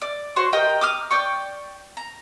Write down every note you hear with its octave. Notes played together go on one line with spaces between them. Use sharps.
D5
F#4 C5 C#5 C#6
G4 A#4 D#5 G5
D6 D#6 F6
D5 G5 C#6
A#5